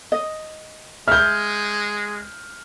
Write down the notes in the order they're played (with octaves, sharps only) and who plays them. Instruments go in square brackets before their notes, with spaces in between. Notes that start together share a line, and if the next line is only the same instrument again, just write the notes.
[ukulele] D#5
[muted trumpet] G#3 [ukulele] E5 [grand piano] F6 G6